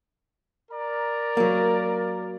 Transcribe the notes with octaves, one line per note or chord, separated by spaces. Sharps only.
A#4 D5 A#5
F#3 A#3